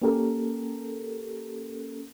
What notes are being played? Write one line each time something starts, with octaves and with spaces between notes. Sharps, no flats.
A#3 C#4 G4 A4 A#4